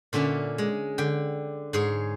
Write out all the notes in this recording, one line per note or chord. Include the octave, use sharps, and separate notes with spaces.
A#2 D3 C#4 E5
G#3
D3 G5
G#2 G#4 C#5